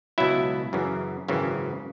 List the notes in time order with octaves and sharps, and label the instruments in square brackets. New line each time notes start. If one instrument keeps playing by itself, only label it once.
[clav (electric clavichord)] C#2 B2 F#3 E4 E5
F#2 C#3 E3
G#1 F#2 C#3 E3